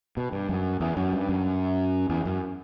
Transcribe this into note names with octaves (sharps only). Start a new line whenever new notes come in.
B2
G2
F#2
E2
F#2
G2
F#2
E2
F#2